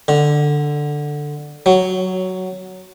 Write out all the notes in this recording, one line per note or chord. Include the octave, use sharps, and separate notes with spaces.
D3
F#3